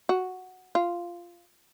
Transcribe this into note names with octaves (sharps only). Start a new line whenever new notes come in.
F#4
F4